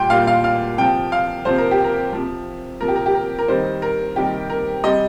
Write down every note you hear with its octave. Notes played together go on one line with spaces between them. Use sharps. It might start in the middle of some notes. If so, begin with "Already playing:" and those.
Already playing: A#2 G3 G5 C6
A#2 G3 F5
F5
F5
C3 F3 G5
F5
C3 F3 C5
A#4
G4
A#4
C3 F3
C3 F3 A#4
G4
A#4
G4
A#4
A#4
C3 D#3 G3 C5
A#4
C3 D#3 G3 G4
A#4
C3 G3 D#5